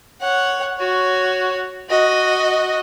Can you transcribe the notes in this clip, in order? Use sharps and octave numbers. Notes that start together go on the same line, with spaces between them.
C#5 F#5
F#4 C#5
F#4 D#5